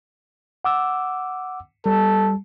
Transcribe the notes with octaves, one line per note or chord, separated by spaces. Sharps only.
F#5 D6 E6
G3 A4